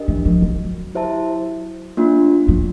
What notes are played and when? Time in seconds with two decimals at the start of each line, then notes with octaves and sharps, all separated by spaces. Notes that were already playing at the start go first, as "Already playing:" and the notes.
Already playing: D4 G4 A#4 D#5
0.08 E3
0.25 F3
0.42 F#3
0.95 E4 G4 C5 E5 A5
1.97 A#3 D4 F4
2.48 F#3